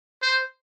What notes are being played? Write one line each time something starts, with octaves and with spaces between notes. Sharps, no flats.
C5